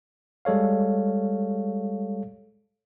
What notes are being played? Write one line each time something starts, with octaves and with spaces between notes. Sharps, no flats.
G3 G#3 A4 C#5 F5